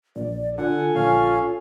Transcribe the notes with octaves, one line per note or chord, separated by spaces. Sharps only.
A#1 D5
D3 F4 A4 F#5 G#5
A#1 C#4 F5